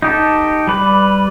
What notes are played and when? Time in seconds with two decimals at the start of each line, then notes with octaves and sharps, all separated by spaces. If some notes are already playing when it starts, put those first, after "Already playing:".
0.02 D#4 G4 A4
0.67 G3 B4 D5